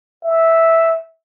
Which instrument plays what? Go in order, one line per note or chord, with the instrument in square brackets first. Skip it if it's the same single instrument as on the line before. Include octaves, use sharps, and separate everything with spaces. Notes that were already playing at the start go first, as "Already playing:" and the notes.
[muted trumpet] E5